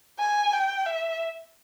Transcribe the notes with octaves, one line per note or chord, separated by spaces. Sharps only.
G#5
G5
E5